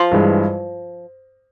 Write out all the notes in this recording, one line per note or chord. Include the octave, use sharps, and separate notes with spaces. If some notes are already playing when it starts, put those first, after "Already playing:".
Already playing: F3
G2 E3 G#3